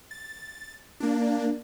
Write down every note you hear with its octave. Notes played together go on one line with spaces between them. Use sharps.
A6
A#3 D4